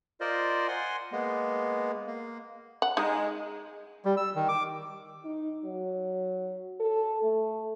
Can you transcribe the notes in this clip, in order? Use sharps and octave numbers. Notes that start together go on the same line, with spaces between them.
F4 A#4 C5 D5 D#5
F#5 G#5 C6
G#3 A#3 B3
A#3
F#5
G#3 D#4
G3
E6
D#3
D6
D#4
F#3
A4
A3